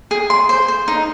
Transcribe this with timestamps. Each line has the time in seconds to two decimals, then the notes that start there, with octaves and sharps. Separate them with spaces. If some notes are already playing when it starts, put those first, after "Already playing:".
0.11 G#4
0.30 C6
0.49 C5
0.68 C5
0.88 D#4